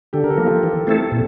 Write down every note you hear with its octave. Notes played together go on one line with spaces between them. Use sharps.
D3 G4 A4
A#4
G4 A4
F3 A#3
F4 G4
E3
A3 C4 E4 A4
A#2